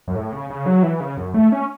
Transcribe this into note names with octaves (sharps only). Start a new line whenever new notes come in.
F#2
A2
C#3
C#3
F#3
E3
C#3
F#2
A3
C#4